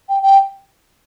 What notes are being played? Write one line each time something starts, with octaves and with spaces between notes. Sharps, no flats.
G5
G5